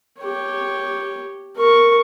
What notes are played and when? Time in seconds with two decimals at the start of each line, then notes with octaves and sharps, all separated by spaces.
0.21 G4 C#5
1.57 A#4 C#6